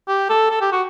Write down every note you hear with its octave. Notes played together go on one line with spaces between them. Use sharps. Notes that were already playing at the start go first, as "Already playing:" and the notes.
G4
A4
A4
G4
F#4